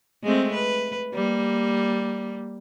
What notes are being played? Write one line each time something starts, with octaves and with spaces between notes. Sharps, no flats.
G#3 A3 C4
B4
G3 A#3